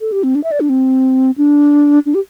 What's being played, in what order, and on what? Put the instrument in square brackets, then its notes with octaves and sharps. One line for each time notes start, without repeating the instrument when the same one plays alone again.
[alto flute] A4
G4
C4
D4
E5
D5
D4
C4
D4
D4
G4